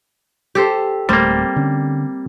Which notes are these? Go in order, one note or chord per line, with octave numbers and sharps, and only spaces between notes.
G4 A4 C5
D1 G3 A3 A#3 C4
D3 C#4